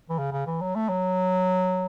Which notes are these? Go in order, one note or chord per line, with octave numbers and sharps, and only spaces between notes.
E3
C#3
C#3
E3
F#3
A3
F#3